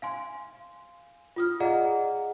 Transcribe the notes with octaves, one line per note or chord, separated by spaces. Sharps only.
F5 G#5 C6
F4 D#6 F6
G#4 D5 D#5 F5 F#5 A#5